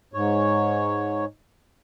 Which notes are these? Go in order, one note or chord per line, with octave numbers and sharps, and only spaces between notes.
G#2 C#5